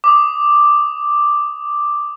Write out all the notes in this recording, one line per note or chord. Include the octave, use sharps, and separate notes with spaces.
D6 D#6